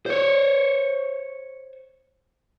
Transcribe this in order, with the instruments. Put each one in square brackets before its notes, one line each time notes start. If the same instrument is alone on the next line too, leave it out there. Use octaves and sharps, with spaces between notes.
[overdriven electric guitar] C5 C#5